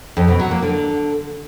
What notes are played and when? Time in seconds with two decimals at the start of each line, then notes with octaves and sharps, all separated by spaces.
0.17 F2
0.28 B2
0.40 F#3
0.51 A#3
0.62 D3